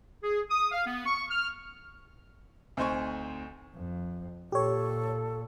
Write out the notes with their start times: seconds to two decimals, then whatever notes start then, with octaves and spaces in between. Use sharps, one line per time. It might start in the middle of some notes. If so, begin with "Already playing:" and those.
0.23 G#4
0.50 D#6
0.72 F5
0.87 B3
1.06 C#6
1.30 F6
2.77 D2 C4 D#4 C5 G#5 C#6
3.75 F2
4.52 A#2 G4 A4 C#5